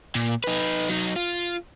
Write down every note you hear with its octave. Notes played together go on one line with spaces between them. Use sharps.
A#2
D#4 B4
F#3 D#4
F4